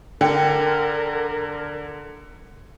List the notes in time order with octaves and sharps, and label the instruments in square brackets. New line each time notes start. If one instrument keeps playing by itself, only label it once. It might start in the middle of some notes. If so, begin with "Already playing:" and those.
[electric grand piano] D3 [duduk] A#4 [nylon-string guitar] G5